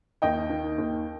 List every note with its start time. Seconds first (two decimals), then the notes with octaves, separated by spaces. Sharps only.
0.22 D#2 D#5 G5
0.50 D#3
0.78 D#2